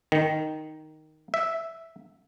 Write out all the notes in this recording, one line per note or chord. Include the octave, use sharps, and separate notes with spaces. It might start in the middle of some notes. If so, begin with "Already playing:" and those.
D#3
E5